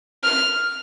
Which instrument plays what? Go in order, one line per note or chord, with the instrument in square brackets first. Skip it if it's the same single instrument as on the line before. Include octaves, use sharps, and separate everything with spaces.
[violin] F6